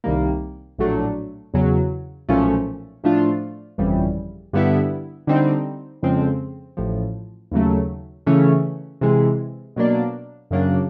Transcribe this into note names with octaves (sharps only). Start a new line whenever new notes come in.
C2 C3 D#3 G3 A#3
A#1 A2 F#3 A3 D4
E2 C#3 F#3
B1 A#2 F3 A3 C#4
A2 F3 A3 D4 F4
G1 F2 C#3 E3 G3
G2 D3 G3 B3 E4
D3 G3 C4 D#4
F2 C#3 F3 G#3 C4
A1 A2 F3
D#2 C#3 F#3 A3
C#3 E3 A3 C#4
C3 E3 G#3
B2 F#3 A#3 D4
F#2 C#3 F#3 A#3 D4